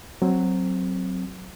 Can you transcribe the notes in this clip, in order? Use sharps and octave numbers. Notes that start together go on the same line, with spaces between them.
F#3 C4